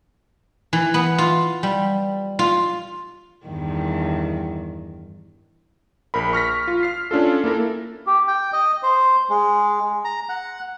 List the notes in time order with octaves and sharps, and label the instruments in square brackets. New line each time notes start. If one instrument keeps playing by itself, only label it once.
[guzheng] E3
B3
F4
G3
F4
[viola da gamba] E2 G2 D#3
[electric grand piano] A#1 A#4 B5
C#6 F6 A#6 B6
F4
F6 C7
C#4 D4 F4 A4
A#3 E4 A4 A#4
[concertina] G4
G5
D#5
C5
G#3
A#5
F#5